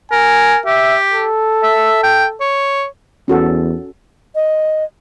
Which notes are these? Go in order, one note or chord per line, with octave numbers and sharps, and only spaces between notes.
A#4 G#5
G4 E5
A4
E5
G5
C#5
E2 C#4 F#4 A4
D#5